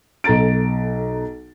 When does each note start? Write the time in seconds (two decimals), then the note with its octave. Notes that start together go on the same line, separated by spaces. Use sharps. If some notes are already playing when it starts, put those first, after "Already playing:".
0.24 B1 A4 A#5 A6 D7